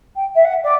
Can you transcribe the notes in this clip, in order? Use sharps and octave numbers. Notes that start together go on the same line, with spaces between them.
G5
E5
F#5
D5